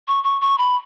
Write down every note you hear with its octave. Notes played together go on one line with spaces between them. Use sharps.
C#6
C#6
C#6
B5